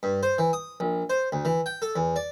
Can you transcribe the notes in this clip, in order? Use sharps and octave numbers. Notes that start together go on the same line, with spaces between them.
G2
C5
E3
D#6
A#1
C5
D2
E3
G5
A4
E2
D5